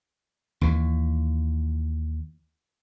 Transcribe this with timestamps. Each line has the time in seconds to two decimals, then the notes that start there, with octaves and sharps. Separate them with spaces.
0.61 D#2 E3